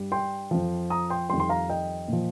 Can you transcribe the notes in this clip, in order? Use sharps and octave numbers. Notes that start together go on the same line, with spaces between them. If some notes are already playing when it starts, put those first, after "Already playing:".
Already playing: G2 G3
G5 C6
F2 F3
A#5 D#6
G5 C6
F2 D#3 G3 G5 C6
C6
F5 A#5
D#5 G5
A#2 F3